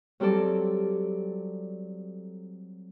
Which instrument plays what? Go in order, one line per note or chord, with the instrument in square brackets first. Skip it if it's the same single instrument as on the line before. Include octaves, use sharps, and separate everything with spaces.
[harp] F#3 G3 C4 A4 D5